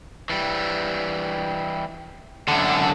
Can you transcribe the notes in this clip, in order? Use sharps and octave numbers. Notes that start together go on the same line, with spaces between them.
E3 G3
F#2 D3 D4 A4